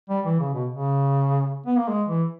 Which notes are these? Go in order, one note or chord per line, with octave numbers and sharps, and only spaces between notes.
G3
E3
C#3
B2
C#3
B3
A#3
G#3
E3